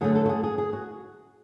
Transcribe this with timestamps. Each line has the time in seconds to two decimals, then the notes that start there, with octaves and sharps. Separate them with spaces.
0.01 D3 F#3 A3 G#4
0.15 A4
0.26 F#4
0.29 G#4
0.44 G#4
0.58 G#4
0.73 F#4